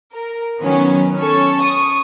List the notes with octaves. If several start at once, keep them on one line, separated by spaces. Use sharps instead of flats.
A#4
D#3 F#3 B3 C#4
C#4 A4 C#6
C#6 D#6